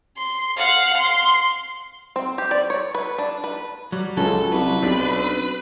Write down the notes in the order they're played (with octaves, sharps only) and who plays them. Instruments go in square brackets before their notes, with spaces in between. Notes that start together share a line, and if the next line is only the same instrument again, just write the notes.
[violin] C6
F5 F#5
C6
[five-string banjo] C4
G4
D5
C#5
B4
D4
B4
[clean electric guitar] F#3 G3
[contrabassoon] C#2 [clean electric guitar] F#3 [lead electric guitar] A4
[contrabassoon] C2 [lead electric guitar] B4
[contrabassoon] B1 [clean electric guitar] C4 D4